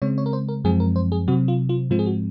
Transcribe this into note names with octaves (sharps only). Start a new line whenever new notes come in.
C#3 G#3 C4 C#5
C#5
A#4
C5
A#4
F#2 F3 G#3 C4 G#4
A#4
C5
G#4
C3 F#3 C4 F#4
F4
F4
G#2 F3 G#3 C4 F4
G#4
F#4